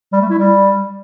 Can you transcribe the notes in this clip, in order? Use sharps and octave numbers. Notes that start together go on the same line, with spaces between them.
G3
A3
E4
G3